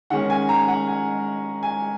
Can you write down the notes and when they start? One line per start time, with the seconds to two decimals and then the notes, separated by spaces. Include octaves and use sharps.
0.10 D#3 G#3 C#4 F#5
0.30 G#5
0.49 A#5
0.68 F#5
0.87 G#5
1.63 G#5